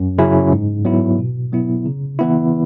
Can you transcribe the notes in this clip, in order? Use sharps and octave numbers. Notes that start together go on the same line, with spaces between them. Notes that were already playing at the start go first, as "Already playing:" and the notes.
Already playing: F#2
C#3 F#3 C#4 E4
G#2
F#3 B3 E4
B2
F#3 B3 E4
C#3
E3 B3 E4